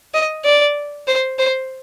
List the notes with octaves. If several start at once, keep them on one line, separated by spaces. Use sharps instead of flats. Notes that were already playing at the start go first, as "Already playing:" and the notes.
D#5
D5
C5
C5